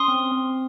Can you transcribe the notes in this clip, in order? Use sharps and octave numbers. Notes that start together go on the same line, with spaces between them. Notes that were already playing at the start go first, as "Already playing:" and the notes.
Already playing: C#4 C6 D#6
C4
C4